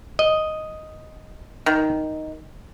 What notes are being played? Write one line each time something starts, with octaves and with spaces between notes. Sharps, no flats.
D#5
D#3